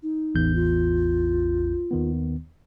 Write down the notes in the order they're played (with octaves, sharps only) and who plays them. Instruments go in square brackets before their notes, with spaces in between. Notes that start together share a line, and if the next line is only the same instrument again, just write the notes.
[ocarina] D#4
[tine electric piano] A1 E2 G6
[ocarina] F4
[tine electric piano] D#2 D#3 B3